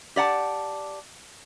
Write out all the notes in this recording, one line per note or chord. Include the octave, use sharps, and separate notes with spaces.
G4 D5 F#5 A5